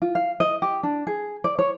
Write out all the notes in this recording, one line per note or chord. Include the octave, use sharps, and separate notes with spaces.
F4
F5
D#5
G4
D4
G#4
D5
C#5